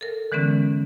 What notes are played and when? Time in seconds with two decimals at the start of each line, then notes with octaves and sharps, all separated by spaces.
0.01 A4 A#4
0.32 D3 E3 G#3 B3 C#4